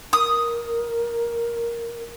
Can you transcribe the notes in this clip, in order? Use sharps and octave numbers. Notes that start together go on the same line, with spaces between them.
A#4 D#6